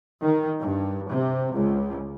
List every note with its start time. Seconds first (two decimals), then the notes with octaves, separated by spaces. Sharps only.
0.23 D#3
0.61 G2
1.11 C3
1.54 C#2